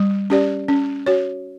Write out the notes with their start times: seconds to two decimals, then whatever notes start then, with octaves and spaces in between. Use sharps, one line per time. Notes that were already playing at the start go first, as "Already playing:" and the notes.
Already playing: G3
0.30 C#4 G4 D5
0.68 C#4
1.06 F#4 C#5